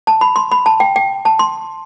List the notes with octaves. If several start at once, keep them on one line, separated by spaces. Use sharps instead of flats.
A5
B5
C6
B5
A5
G5
G5
A5
C6